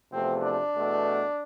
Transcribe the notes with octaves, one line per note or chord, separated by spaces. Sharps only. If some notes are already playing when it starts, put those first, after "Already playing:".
E2 C3 F3 A3 C4
D4
E2 B2 A3